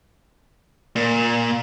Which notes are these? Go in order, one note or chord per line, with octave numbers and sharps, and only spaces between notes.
A#2